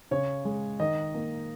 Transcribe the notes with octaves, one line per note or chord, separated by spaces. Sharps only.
C#3 C#5
G#3
D#3 D#5
A#3